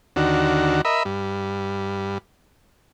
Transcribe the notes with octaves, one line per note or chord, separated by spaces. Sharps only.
D#2 D3 F#4
A#4 D#5 E5 B5
G2